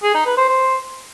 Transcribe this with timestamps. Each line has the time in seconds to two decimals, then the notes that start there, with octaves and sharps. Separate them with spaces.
0.03 G#4
0.15 D#4
0.26 B4
0.37 C5
0.49 C5